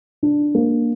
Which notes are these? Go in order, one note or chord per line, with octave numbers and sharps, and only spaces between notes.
D4
A#3